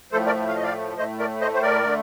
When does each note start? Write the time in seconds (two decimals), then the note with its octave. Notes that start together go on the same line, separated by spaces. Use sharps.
0.12 A2 F3 A3 A4 C5
0.26 A#4 D5
0.48 F5
0.56 D#5
0.63 D5 F5
0.97 A2 A3 C5 D#5
1.19 A#4 D5
1.41 C5 D#5
1.54 C5
1.62 A#4 D5
1.83 D3 A3